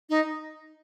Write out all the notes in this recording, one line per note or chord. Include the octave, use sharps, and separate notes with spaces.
D#4